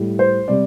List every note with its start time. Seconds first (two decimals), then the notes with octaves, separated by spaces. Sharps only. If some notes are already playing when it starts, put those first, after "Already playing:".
Already playing: A2 G3
0.19 C5
0.48 C3 G3 D5